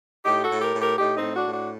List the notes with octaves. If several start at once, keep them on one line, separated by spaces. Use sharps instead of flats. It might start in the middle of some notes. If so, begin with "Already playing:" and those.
A2 D#4 G4
F#4 A4
A2
G4 A#4
A2
G4 A#4
A2 D#4 G4
C4 D#4
A2
D4 F#4
A2
D4 F#4